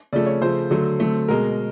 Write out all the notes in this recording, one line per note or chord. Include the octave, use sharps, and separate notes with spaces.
C#3 F3 A3 D5
C#5
C#3 F3 A3 C5
D3 F#3 A3
D3 F#3 A3
B2 G#3 A#4